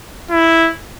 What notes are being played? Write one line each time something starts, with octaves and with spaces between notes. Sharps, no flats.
E4